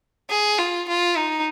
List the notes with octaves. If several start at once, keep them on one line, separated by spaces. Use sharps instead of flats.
G#4
F4
F4
D#4